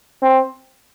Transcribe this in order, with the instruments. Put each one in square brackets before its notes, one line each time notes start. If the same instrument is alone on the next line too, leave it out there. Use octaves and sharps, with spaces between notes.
[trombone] C4